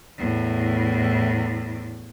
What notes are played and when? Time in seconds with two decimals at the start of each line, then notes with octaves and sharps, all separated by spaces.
0.18 E2 A2